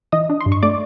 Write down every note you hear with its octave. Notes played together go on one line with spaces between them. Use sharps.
E3 D#5 D#6
D4
C6
G2
C#6
A3 D5 D6